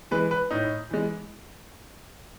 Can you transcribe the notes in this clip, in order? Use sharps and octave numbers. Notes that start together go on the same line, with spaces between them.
E3 G#3 B4
B4
A2 D#4
E3 G#3